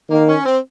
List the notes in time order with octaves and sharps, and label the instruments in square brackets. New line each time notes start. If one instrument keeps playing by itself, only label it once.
[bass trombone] D#3 [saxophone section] A#3
[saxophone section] C#4
C4